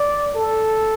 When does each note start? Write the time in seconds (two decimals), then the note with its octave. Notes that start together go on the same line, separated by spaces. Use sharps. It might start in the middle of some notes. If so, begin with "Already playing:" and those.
Already playing: D5
0.34 A4